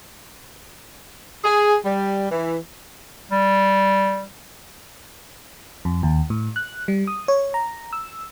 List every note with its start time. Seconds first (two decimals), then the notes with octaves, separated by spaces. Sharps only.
1.44 G#4
1.85 G3
2.31 E3
3.31 G3
5.85 F2
6.03 D#2
6.30 A2
6.56 F#6
6.88 G3
7.07 D#6
7.28 C#5
7.54 A#5
7.93 E6